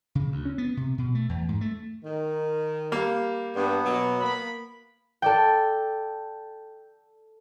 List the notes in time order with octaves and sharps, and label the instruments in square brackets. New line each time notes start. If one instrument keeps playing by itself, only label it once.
[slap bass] C#3
D2
C#4
B3
C3
B2
A3
E2
G#2
A3
[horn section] D#3
[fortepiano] G3 A#3 F5
[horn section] G2 [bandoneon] B3
[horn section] B2 F#3
A#3 B5
[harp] A4 D5 G5